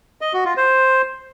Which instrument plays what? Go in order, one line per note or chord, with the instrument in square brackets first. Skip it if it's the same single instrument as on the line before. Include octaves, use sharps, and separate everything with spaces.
[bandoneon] D#5
F#4
F4
C5